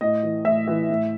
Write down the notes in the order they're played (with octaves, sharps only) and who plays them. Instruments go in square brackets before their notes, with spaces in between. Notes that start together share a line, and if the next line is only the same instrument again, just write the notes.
[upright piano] A2 D#5
E3
A2 E5
E3
A2